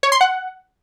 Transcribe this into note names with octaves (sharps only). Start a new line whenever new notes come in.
C#5
C6
F#5